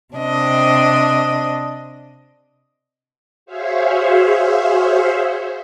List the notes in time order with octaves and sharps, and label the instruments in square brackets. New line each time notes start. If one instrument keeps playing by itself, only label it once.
[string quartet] C3 D4 D#5
[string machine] F#4 G#4 C5 C#5 E5 F5